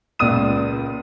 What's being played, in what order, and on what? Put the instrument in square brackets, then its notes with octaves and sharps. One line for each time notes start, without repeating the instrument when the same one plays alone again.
[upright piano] C#2 A#2 D5 D#6 D#7